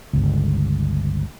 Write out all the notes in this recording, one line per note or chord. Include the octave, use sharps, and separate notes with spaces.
G1 C#2